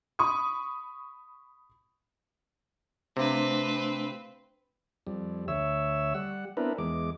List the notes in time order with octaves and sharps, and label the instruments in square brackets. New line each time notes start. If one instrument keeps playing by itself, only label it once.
[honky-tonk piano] B5 C#6 D#6
[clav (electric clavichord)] C3 [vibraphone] A3 D4 F5 [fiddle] C4 B4
[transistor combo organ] F2 G3
D2 C#5 E5 E6
G3 F#5
B3 C4 D4 E4 A#4 B4
E2 G#3 D6